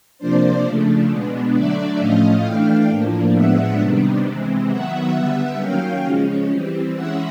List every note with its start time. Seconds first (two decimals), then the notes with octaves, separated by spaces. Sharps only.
0.18 C3 F3 A#3 D4 C5 D5
0.63 C#3 F3 A3 D4
1.08 B2 G#3 B3 D4
1.53 D3 F#3 A3 D4 D5 E5
1.98 A2 F3 A3 C#4 D#5 F5
2.43 E3 A3 D4 F5 G5
2.90 A2 F3 A#3 D4
3.34 A2 F3 G#3 B3 D4 E5 F#5
3.79 C3 D#3 G3 B3 D4
4.24 C3 E3 G#3 C4
4.70 D#3 F#3 B3 E5 F#5
5.14 D3 G3 B3 E5 F#5
5.59 D#3 F#3 A#3 C#4 F5 G5
6.04 C#3 F3 G#3 C#4
6.49 E3 G3 C4
6.94 E3 G#3 C#4 E5 F#5